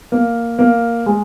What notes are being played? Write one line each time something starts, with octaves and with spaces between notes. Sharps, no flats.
A#3
A#3
G#3